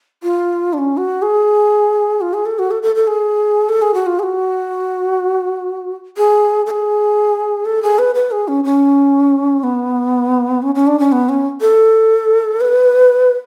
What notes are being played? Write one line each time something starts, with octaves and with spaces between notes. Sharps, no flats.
F4
D4
C#4
F#4
G#4
F4
G#4
A4
F#4
A4
A4
A4
G#4
A4
G#4
F#4
F4
G#4
F#4
G#4
A4
G#4
A4
G#4
B4
B4
G#4
C#4
C#4
B3
C#4
C#4
D4
C#4
B3
C#4
A4
B4